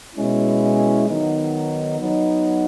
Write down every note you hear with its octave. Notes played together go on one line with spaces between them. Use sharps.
B2 G#3 C#4 E4
D#3 F#3 B3 D#4
F#3 B3 D#4